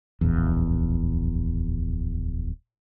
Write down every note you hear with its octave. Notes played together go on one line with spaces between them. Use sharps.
D1 A#1 E2